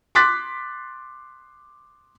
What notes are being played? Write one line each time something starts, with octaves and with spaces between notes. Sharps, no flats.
C6 D6 F#6 A6 B6